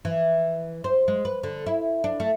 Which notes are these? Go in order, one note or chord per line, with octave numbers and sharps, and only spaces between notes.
E3
C5
G#3
B4
D3
E4
D4
A3